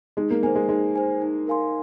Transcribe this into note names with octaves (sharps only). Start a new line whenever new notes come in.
G#3 D#4
A#3
A#3 C5 G#5
G#3
G#3 D#4
C5 G#5
D#4
A#4 F5 G#5 C6